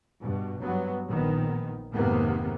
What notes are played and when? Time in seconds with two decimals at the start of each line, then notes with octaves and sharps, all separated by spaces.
0.22 G2 B2
0.61 G2 F#3 B3
1.09 A#1 D#3 B3
1.92 F1 G#2 C3 D#3 A#3 B3